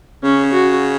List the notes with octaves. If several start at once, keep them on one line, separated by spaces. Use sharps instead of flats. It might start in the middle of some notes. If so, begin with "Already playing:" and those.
C#3 C#4
F#4